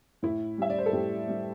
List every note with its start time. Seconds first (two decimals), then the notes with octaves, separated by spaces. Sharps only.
0.23 A2 E4
0.58 G3 E5
0.70 D5
0.78 C5
0.86 A4
0.93 A2 G4
1.28 G3